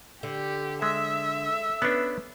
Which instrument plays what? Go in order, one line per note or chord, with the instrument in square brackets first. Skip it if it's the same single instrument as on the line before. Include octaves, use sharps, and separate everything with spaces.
[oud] D3 [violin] G4
[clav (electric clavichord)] G#3 [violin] E5 [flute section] E6
[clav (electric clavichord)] B3 C#4 D4 [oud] B4